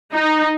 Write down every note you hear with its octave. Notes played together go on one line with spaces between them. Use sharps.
D#4